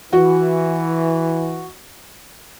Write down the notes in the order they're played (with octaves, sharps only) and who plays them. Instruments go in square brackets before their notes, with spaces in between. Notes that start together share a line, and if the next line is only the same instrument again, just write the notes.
[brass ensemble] E3 [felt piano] F#4